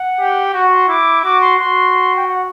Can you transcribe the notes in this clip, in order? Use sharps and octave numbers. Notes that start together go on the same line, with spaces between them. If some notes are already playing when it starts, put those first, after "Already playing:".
Already playing: F#5
G4
F#4 F#5
C6
E4 D6
F#4 D6
C6
F#4 C6
G5
F#5